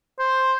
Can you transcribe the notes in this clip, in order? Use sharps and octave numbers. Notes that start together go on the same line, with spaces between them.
C5